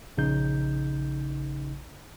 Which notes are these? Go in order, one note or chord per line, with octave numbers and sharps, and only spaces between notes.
A#1 C#3 D#4 G6